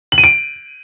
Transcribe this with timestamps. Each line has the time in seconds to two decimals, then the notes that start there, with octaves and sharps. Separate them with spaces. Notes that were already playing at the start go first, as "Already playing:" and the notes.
0.12 F#7
0.18 D#7
0.24 D7